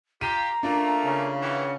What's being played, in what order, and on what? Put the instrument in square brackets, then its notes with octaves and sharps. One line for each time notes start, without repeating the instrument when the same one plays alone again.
[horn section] F4 G4 [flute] A#5 [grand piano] D#7
[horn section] A3 A#3 [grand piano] D4 F4
[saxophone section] C#3
[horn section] D#3 E3 [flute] F#5